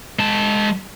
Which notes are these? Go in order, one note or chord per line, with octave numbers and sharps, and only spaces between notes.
G#3 A5